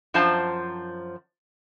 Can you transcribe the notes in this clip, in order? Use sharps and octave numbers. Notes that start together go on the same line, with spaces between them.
F#2 F3 D4 C5 A5 A#5